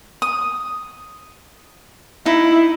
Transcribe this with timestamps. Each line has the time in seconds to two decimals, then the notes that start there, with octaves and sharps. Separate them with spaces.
0.22 D#6
2.26 D#4 E4